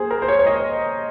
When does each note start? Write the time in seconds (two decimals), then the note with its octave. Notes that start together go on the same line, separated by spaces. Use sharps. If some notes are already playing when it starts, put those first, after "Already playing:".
Already playing: A#3 G#4 C5
0.11 A#4
0.22 C5
0.28 C#5
0.39 C#5
0.46 D#5